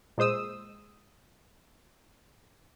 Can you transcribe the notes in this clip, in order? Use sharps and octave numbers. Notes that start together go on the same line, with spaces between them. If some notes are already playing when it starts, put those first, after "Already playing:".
A#2 G#3 C5 D#6 E6